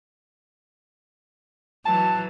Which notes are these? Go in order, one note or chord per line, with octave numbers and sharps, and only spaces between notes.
E3 F#3 A5